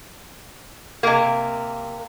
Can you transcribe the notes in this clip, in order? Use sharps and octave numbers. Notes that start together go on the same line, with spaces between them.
C3 A#3